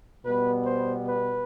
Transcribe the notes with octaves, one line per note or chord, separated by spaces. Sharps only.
B2 G3 B3 B4
C5
B4